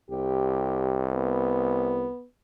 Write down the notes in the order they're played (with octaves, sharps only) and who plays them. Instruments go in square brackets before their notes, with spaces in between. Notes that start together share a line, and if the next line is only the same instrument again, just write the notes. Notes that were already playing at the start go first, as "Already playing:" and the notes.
[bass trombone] C2 [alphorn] G4
[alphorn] B3